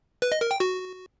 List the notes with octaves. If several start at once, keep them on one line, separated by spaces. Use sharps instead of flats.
B4
D#5
A#4
G5
F#4